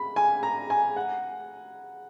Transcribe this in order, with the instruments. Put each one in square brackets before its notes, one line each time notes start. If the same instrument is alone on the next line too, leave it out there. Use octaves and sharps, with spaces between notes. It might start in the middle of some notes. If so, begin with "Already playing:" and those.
Already playing: [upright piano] B5
G#5
A#5
G#5
F#5